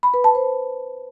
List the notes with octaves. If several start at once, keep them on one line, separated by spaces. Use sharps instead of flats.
B5
B4
A5
C5